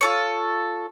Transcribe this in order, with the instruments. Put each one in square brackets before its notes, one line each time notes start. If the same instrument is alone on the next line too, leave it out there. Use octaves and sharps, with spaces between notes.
[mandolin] F4 A4 C#5